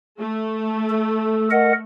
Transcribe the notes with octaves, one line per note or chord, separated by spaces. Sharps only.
A3
A4
A#4 D#5 F#5